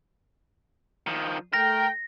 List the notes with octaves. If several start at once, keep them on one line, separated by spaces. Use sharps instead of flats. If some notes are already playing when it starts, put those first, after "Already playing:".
D#3 F3
A3 A#4 G5 A#6